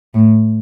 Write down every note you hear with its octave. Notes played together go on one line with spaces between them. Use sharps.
A2